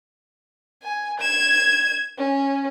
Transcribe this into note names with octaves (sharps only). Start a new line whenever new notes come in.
G#5
G#6 E7
C#4